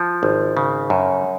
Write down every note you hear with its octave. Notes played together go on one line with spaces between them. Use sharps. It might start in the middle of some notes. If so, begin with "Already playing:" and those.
Already playing: F3
G#1
C#3
F#2